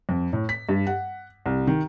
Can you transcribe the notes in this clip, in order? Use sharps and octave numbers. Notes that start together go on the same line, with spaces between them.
F2
A2
B6
G2
F#5
C2
D#3